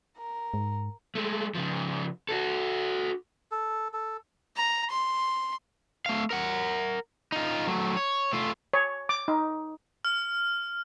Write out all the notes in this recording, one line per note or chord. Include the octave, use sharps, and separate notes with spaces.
A#4
G#2
G#3 A3
C#3 F3
F#4 A4
A4
A4
A#5
C6
A3 F5
A#4 F#5
D#4 F4
F#3 A3
C#5
A3 F4
C#5
D6
D#4
F6